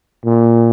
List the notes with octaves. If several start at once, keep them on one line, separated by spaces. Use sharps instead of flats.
A#2